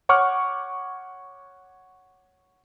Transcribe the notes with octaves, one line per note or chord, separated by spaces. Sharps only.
C#5 F#5 C#6 D6 F6